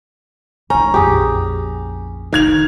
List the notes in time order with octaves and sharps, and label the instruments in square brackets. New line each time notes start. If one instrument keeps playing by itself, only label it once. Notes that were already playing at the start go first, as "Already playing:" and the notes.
[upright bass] C#2 D#3 [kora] C#4 [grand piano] A#5
[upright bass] A#1 F2 [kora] G4 G#4
[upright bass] F1 D3 [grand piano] D#3 G#6 F7 [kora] F5